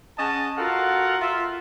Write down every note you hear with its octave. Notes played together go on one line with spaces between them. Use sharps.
C#4 G#4 D#5 F#5 A5
F4 F#4 A4 A#4 F5 F#5
F4 E5